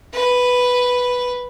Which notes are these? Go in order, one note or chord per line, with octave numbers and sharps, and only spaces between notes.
B4